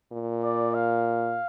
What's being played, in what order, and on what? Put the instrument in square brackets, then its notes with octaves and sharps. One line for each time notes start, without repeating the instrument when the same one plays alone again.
[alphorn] A#2
[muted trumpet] D5
F5